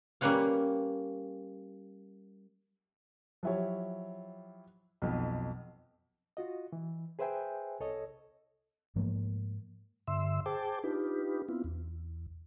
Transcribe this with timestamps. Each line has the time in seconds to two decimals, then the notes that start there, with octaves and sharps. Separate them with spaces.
0.21 G3 A#3 C#4 B4 C#5 F5
3.43 F3 F#3 E4 G4 C#5
5.02 B1 F2
6.37 F4 F#4 D#5
6.73 E3
7.19 G#4 B4 C5 E5 G5 G#5
7.80 C2 A4 C#5 D#5
8.96 G#2 F3 A3 A#3
10.07 G2 D3 E5 C6 E6
10.46 G#4 C5 G5 A5 D6
10.84 D4 D#4 F4 G4 B4
11.49 B3 C4 E4 F4
11.64 E2